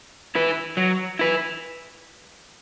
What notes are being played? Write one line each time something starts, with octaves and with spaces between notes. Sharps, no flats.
E4 B4
F#3
E4 B4